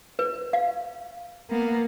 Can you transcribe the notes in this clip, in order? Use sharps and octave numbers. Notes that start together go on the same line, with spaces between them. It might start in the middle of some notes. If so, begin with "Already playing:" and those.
B4
F5
A#3 B3